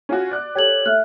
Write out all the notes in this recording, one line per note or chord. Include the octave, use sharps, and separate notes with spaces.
C#4 F4 F#4
D5 F#6
G4 A4 C#5 G#6 F#7
A3 E5 F6 F#6